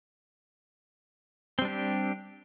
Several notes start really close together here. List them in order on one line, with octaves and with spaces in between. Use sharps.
C4 G3 D4 G4